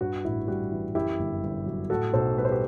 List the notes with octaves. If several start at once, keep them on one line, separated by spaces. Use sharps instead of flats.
G2 F#4
A1 E4
G3 F#4
E3
F#2 E4 G4
G1
G1
F#3
A2 F#4 A4
B1 A4 C5
G3 B4
C5
G4 B4